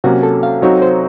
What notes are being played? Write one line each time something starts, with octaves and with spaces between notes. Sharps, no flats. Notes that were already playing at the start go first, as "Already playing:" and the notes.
C3 F#3 A#3 C#4 F#4
A4
F5
F#3 C4 D#4 F#4 C#5
C5